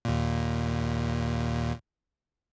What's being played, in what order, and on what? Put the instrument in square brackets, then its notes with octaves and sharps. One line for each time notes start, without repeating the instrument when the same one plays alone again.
[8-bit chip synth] D#2 A#2